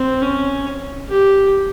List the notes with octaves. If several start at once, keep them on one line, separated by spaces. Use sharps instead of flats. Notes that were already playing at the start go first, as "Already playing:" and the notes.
Already playing: C4
C#4
G4